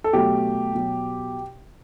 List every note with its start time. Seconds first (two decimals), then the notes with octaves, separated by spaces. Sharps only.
0.04 A4
0.13 B2 F#3 A3 G4
0.74 B2 F#3